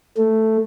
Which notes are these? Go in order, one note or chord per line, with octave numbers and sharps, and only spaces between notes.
A3